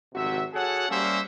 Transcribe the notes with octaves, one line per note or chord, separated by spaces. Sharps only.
G#1 F2 C3 F#4 E5
F#4 G#4 A4 C#5 F#5
G3 A#3 C#4 G4 C5 E5